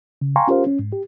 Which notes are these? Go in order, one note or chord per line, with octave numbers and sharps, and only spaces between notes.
C#3
F5 G5 G#5 A#5 C6 C#6
C#4 F4 G4 A#4 C5 F5
C#4
G#2
G4